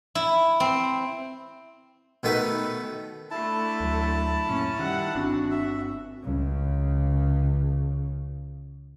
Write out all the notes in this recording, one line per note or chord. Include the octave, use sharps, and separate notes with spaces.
E4
C4
B2 D#3 A3 B4
D3 A3 E4 A5
D2 F#3
F#2 A#2 C#4
D#3 G3 F#5
G1 C4 D4 F#4
E5
C#2 C#3